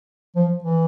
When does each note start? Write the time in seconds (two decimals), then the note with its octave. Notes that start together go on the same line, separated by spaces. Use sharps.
0.36 F3
0.64 E3